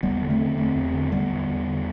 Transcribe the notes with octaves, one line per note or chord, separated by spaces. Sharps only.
E2 G3 B3
D3
A3 C4
D3
E2 A3 C4
E2
D3
D3 G3 B3
E2
E2
D3